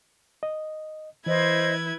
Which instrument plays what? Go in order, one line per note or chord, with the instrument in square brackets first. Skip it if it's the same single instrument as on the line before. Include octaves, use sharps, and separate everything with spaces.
[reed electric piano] D#5
[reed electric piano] E3 [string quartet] E4 B4 G#6 [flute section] C5 D#5